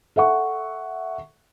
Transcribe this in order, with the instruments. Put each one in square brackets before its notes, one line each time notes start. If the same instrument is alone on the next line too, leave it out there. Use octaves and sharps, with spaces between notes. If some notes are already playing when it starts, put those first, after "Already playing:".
[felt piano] A4 E5 F#5 C#6